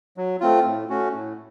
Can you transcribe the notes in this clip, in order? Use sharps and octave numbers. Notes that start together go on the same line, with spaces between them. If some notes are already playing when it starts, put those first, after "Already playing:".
F#3
A3 C4 F4
A2
A3 C#4 F#4
A2